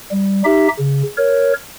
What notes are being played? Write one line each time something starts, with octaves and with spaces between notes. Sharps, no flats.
G3
D#4 G4 E5
C#3
A#4 C#5